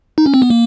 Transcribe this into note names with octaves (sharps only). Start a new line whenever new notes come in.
D#4
C#4
C4
B3
A#3